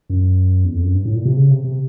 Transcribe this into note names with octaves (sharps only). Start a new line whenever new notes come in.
F#2
E2
F2
F#2
G2
A2
A#2
C3
C#3
C3
C3